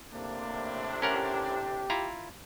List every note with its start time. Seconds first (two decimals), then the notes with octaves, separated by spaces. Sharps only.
0.13 A2 C3 A#3 D4
1.02 C#4 G4 A#4 F#5
1.90 E4 F4 A#5